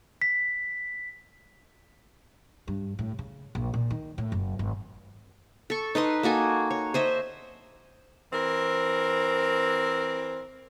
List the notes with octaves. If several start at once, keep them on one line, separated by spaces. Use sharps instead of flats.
B6
G2
A2
C#3
A#1
A#2
D#3
A2
F#1
G#1
A4 C#6
D#4 B4 D#5 C6
A#3 F#4 A4 G#5
C#5
C5 D#5 E5
E3 C4 A#4